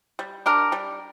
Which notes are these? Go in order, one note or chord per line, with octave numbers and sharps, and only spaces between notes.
G3
D4 G4 A#4
G3